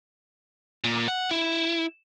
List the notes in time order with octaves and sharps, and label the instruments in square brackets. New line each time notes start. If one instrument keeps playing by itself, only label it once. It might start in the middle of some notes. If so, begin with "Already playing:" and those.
[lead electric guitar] A#2
F#5
E4